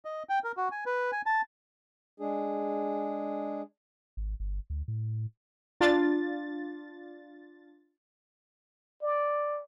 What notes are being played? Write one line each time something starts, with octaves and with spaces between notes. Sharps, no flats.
D#5
G5
A#4
F#4
G#5
B4
G#5
A5
G#3 D4 G#4
G#1
G1
D2
A2
D4 F4 A6
D5